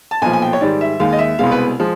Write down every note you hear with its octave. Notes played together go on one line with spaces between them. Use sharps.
A5
B1 A#2 F3 G#5
G#5
G5
C#5
G#2 D#3 G3 D5
E5
D#2 D#3 G#3 F5
D#5
E5
C2 B2 G#3 F5
B4
F3 G#3